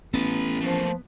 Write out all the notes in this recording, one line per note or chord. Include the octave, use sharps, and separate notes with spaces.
A1 B3 A4 B4
F3 A3 A#3